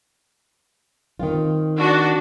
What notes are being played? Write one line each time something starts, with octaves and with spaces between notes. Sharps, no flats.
D#3 C4 F4
D4 F#4